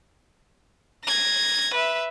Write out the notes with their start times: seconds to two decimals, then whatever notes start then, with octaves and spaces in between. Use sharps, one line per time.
1.05 G#6 A#6
1.74 B4 E5